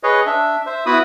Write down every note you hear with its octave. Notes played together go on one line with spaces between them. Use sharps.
G#4 B4 C#5 D#5
D4 E5
C5 E5
B3 E4 F#4 B4 B5 D#6